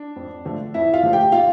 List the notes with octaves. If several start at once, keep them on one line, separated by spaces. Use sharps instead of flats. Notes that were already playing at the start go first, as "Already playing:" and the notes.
Already playing: D4
F2
D3 F3 A3
F2 E4 E5
F4 F5
D3 F3 A3
G4 G5
A#2 F4 F5